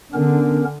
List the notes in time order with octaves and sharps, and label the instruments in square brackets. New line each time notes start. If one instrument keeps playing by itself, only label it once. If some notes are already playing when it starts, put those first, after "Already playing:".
[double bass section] D3 [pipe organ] B3 C#4 A#4